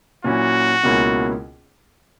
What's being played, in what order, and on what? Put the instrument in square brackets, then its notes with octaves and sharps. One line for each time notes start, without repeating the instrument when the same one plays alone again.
[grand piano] A#2 F#3 C#4 E4 [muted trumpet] F#4
[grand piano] C#2 B2 A#3 C#4 E4